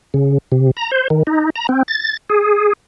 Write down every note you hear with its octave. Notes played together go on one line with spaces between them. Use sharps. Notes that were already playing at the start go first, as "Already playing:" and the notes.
C#3
C3
A#5
C5
D#3
D#4
A#5
C4
A6
G#4